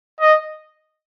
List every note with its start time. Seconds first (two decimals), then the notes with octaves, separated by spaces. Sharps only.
0.21 D#5